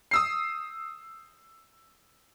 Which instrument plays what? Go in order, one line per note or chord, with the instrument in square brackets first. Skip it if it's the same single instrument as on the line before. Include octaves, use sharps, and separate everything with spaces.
[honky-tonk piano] D#6 E6 C7